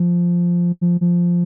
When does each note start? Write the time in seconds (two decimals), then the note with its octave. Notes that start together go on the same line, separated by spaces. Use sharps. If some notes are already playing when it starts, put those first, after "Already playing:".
Already playing: F3
0.81 F3
1.01 F3